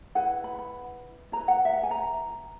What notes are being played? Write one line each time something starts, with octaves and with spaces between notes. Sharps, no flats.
E4 B4 F#5
B5
B5
E4 B4 A#5
F#5
E5
F#5
G#5
A#5